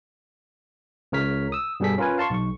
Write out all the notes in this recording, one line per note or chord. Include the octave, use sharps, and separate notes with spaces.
C#2 C#3 A#4 C#5 F6 B6
D#6 E6
G2 B2 G3 G#4 A4 B6
C#4 F4 A#4 B4 G#5
F5 A5 C6 C#6
B1 C#6